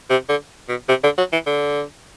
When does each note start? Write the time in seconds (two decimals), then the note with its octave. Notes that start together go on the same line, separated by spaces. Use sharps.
0.10 C3
0.29 D3
0.69 B2
0.89 C3
1.04 D3
1.18 F#3
1.33 E3
1.47 D3